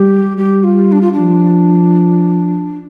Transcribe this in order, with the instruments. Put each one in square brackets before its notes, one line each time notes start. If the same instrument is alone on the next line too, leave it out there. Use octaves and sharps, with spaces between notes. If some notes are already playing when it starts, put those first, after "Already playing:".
Already playing: [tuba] G3 [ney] G4
[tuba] G3 [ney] G4
[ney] F4
D4
F4
D4
[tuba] F3